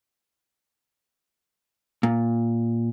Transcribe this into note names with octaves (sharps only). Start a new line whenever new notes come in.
A#2